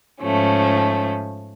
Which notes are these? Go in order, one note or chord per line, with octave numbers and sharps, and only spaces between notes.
G#2 F3 A3 C#4